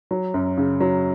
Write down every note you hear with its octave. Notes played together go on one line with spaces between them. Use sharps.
F#3
F#2
C#3
F#3